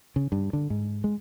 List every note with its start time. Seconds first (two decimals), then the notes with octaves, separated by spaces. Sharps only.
0.16 C#3
0.32 G2
0.53 D3
0.70 G#2
1.04 G#3